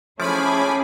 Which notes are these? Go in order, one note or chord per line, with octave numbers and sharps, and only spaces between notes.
F3 A3 C#4 E4 G#4 G#5 B5 D6